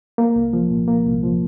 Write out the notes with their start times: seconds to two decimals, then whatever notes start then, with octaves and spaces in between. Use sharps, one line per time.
0.18 A#3
0.36 C2
0.53 F3
0.70 A#2
0.88 A#3
1.06 C2
1.23 F3